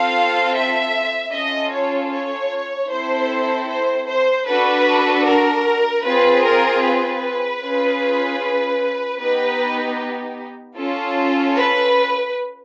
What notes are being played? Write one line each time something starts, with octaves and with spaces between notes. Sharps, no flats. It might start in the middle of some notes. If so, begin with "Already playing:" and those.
Already playing: C4 F4 A4 F5
E5
C#4 F4 A4 D#5
C#5
C#5
C4 E4 A4 C5
C5
C5
D4 F#4 A4 B4
A#4
C4 F4 G#4 B4
A#4
B4
C#4 F4 G#4
B3 D#4 G4 B4
C#4 F4 A4
B4